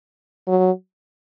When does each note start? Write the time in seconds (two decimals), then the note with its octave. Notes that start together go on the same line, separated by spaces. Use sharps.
0.48 F#3